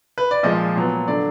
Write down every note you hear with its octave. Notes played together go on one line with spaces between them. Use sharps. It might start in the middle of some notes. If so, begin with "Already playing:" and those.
B4
D5
A#2 F3 G#3 D#5
A#2 F#3 B3
D3 F#3 D5